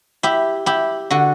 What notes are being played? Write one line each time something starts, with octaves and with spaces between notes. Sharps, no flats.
E4 G4
E4 G4
D3 F#4